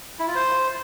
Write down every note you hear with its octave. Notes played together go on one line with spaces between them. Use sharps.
E4
F4
C5